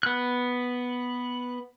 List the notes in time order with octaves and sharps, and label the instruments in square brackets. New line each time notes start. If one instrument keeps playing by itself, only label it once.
[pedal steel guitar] B3 F#6